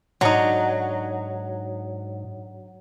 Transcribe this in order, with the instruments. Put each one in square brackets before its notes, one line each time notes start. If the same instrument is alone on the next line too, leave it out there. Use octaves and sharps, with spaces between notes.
[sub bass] G#2 [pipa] D3 D#4 [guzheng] F#3